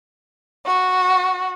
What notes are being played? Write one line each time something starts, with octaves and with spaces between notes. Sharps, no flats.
F#4